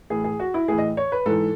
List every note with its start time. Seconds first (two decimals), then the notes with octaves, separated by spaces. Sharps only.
0.10 A2 E3 G#4
0.24 G#4
0.40 F#4
0.54 E4
0.68 A2 G#4
0.72 E3
0.78 D#5
0.97 C#5
1.12 B4
1.26 G#2 E3 A4